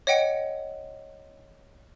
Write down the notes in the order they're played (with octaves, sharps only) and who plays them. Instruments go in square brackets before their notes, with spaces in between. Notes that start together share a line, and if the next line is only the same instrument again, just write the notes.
[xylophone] C#5 D#5 F#5 G5 C#7